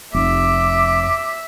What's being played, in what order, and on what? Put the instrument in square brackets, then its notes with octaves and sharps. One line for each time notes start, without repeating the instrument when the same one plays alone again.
[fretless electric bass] F1 [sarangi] E5 [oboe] D6